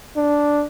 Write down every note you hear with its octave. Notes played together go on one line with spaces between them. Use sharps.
D4